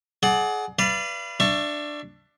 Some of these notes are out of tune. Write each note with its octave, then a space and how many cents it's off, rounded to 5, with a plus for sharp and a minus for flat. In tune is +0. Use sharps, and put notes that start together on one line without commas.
G#4 +35 D5 +15 F#5 +0
B4 +0 D5 +0 F5 -40
D4 +10 E5 +30 C#6 +0